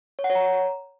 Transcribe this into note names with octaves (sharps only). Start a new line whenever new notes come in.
C#5
F#5
C#5
A#5